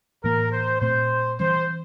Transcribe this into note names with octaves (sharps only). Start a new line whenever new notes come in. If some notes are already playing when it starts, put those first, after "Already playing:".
A2 E3 A#3 A#4
C5
A#2 A3 C4 C5
E3 G3 C4 C5